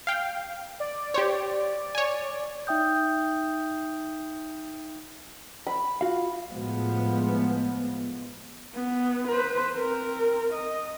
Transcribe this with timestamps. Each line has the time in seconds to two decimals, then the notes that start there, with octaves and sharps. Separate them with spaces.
0.07 F5 G5
0.80 D5
1.14 G4 C5 C#5
1.95 C#5 G#5
2.67 D#4 E5 G5 D#6 G6
5.67 B5
6.01 F4 F#4 F5
6.49 A2 F3 G#3 B3
8.74 B3
9.28 B4 C5
9.74 C4 A#4
10.53 D#5